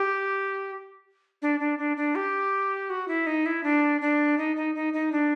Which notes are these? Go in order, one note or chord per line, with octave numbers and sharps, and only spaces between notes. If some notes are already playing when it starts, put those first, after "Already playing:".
Already playing: G4
D4
D4
D4
D4
G4
F#4
E4
D#4
E4
D4
D4
D#4
D#4
D#4
D#4
D4